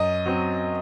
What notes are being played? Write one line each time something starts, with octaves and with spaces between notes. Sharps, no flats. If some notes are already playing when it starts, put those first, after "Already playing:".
Already playing: F#2 D#5
F#3 C4